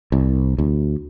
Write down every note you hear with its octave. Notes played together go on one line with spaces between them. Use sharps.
C2
D2